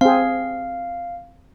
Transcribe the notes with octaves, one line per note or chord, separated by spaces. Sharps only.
C4 G#4 F5